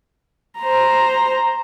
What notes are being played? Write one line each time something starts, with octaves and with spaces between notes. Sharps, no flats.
C5 A#5